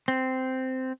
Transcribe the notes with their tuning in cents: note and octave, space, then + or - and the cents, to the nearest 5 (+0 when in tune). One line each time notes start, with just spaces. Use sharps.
C4 -10